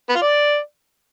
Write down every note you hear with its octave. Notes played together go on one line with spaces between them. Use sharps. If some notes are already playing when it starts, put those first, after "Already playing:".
B3
F4
D5